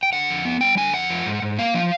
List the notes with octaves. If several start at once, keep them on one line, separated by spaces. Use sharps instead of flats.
G5
D3 F#5
F2
B3
G3 G5
D3 G#5
F2 F#5
F3
G#2
G#2
A#3 F5
F3